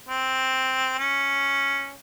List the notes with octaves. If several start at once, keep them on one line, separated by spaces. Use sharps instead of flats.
C4
C#4